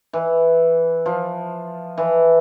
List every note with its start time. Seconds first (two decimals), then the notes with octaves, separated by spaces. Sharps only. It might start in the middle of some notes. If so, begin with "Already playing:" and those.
0.13 E3
1.06 F3
1.98 E3